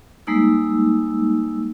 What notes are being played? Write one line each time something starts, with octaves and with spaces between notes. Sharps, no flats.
G3 G#3 A#3 D#4 E6